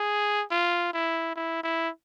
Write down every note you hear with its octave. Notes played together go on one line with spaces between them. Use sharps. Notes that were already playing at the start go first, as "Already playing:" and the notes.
Already playing: G#4
F4
E4
E4
E4